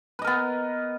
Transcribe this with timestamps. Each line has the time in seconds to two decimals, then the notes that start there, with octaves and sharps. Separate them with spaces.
0.19 B4
0.22 D#5
0.24 A#4
0.27 B3